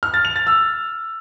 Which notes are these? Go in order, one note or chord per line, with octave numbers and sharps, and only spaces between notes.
F6
A6
F7
A6
E6